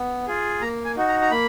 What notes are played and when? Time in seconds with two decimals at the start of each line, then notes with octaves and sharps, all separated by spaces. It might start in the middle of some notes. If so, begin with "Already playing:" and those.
Already playing: B3
0.27 F4 G#4
0.61 A#3 A#5
0.85 G#5
0.97 D#4 F#4
1.08 A#5
1.21 A#5
1.31 A#3 B5